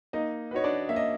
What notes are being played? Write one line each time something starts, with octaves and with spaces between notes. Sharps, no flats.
A#3 D#4 D#5
D#4 F#4 B4 C#5
D4 D5
A#3 E5
D#5